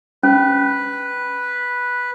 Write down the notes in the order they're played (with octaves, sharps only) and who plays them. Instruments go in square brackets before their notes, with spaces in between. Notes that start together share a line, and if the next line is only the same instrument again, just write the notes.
[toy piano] C#4 [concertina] B4